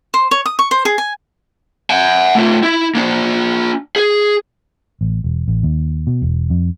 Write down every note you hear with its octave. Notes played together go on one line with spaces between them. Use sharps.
C5
C#5
D#6
C#6
C5
G#4
G#5
F#5 G#5
A3 F4
E4
A#3 D4
G#4
A1
E1
A1
D#2
B2
E1
F2